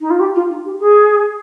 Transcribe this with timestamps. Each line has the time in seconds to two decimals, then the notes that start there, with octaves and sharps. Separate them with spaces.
0.01 D#4
0.10 F4
0.20 G4
0.35 F4
0.50 D#4
0.65 G4
0.80 G#4